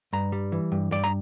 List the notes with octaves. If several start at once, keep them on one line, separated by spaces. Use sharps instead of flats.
G2 A#5
G3
E3
G2
G2 D5
A#5